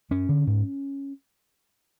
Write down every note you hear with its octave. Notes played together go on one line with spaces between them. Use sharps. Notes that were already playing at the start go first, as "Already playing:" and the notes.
F#2 C#4
D3
G#2